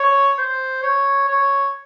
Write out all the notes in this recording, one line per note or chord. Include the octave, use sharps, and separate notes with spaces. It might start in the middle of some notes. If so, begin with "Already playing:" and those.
Already playing: C#5
C5
C#5
C#5